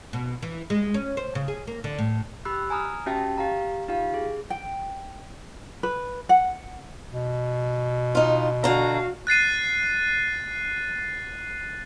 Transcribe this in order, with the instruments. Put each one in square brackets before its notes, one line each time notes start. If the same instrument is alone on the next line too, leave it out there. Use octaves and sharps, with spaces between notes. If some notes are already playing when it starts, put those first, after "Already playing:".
[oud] B2
E3
G#3
C#4
C5
C#3
G#4
A#3
D3
A2
[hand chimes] G4 B5 E6 F#6
G#5 A#5 D#6 F6
C#4 F#4 G4 E5 G5 A5
G4 F5 A#5
D#4 F4 G4 F5
G#4
[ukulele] G5
B4
F#5
[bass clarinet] B2
[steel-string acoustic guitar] D#4 F4
[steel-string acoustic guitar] D3 A#5 [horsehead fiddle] F#4 F5
[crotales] F#6 A6 C7 D#7